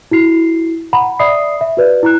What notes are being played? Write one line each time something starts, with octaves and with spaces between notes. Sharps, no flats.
E4 F#4 C7
F#5 A#5 B5
D5 E5 B5 D#6 C7
E5
F#4 B4 D5
E4 A#5 F#6